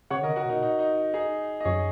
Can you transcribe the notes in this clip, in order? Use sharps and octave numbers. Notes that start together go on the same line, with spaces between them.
C#3 C#5 F#5
D#3 A#4 D#5
C#3
F#4 A#4
A#2 D#4
D#4
D#4
D#4 G#4
D#5
F#2 G#4 C#5